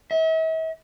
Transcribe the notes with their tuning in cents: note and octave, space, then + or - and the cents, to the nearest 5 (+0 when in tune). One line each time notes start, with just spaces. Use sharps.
E5 -45